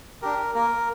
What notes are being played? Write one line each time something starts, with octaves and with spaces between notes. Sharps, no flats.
D4 G4 A#4
A#3 A#4